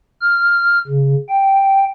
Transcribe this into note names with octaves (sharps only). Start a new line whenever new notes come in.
F6
C#3
G5